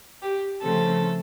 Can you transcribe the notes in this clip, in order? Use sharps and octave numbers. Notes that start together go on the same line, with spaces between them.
G4
C#3 F3 A3 C4 A4